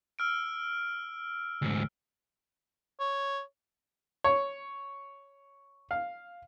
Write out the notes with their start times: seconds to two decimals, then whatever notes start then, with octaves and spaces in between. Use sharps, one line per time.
0.19 E6 F6 D7
1.62 D2 G#2
3.00 C#5
4.24 C#5
5.91 F5